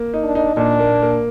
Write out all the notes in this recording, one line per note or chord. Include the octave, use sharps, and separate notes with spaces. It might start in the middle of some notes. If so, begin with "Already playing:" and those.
Already playing: A#3
D#4
D4
D#4
A#2 D4
A#3
A#3